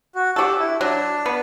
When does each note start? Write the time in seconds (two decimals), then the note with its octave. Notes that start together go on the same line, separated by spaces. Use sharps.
0.15 F#4
0.36 D4 F#4 G4 A4
0.59 E4
0.81 F#3 D4
1.26 B3